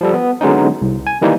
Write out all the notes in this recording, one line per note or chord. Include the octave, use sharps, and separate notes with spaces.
F3 G3 A4
B3
D3 F#3 G#3 B3 C#4 D#4
C2
G#5
D#3 E3 G3 A#3 D#4